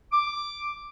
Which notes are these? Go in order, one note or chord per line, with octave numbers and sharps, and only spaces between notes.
D6